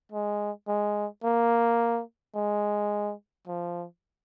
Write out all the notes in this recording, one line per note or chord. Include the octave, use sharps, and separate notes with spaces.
G#3
G#3
A#3
G#3
F3